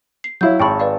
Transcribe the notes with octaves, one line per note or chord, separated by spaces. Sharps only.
C7
F#3 E4 C#5 F5 G6
G#1 G5 A5 B5 C#6
B4 D5 F5